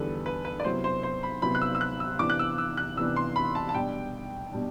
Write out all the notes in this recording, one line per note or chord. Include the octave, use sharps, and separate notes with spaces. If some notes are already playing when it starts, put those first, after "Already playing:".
Already playing: E2 D3 G3 D4 A4 B4
B4
B4
D5
C3 F#3 B3 E4 C5
C5
C5
B5
C3 F#3 B3 E4 B5
F#6
E6
E6
F#6
E6
C3 E3 B3 D4 D6
F#6
E6
E6
F#6
C3 E3 B3 D4 E6
C6
B5
A5
A5
B2 G3 D4 G5
B2 G3 D4